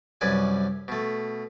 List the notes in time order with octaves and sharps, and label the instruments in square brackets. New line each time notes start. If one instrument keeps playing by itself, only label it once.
[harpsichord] C2 F#2 B4 D5 G#5
B2 A3